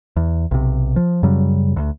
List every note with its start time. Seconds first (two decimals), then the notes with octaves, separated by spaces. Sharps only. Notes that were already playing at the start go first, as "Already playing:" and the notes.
0.16 E2
0.51 B1 C3
0.96 F3
1.23 F#2 C#3 F#3 G3
1.76 D2